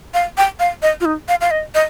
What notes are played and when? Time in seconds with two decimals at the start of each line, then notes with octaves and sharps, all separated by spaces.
0.14 F5
0.38 G5
0.60 F5
0.82 D#5
1.01 F4
1.05 D#4
1.28 F5
1.41 F5
1.51 D#5
1.75 D#5